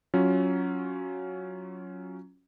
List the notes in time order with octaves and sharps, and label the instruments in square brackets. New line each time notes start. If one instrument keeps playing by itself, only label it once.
[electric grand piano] F#3 C#4 F4